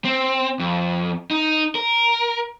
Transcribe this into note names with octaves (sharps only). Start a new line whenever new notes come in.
C4
F2
D#4
A#4